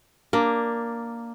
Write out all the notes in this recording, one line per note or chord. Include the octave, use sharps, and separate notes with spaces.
A#3 D4